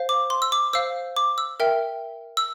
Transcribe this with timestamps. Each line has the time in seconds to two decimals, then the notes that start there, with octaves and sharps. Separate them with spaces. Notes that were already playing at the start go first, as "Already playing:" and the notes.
Already playing: C5 F5
0.09 D6
0.30 C6
0.42 E6
0.52 D6
0.73 C5 F5 E6
1.16 D6
1.38 E6
1.60 A#4 E5 G5
2.37 E6